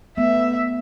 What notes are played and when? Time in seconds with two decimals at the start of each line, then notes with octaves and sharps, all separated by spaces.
0.17 A3 B3 E5